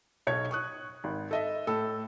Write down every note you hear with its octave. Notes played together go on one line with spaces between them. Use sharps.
B1 D#4 C#5 G#6
C#6 D#6 F#6
G#1
A4 D#5 E5
A2 A4 E6